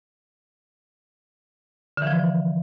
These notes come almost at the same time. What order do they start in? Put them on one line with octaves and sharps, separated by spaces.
D3 E3 F3